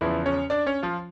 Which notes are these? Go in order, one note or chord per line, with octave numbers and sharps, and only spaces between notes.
E2 C#3 E3 F3 E4
C#4 C#5
D4 D5
C#4 C#5
F3 F4